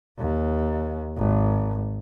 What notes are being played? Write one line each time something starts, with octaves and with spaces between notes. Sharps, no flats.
D#2
G#1